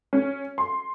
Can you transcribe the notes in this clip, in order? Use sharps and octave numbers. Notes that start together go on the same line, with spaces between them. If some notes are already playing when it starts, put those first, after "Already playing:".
C#4
C6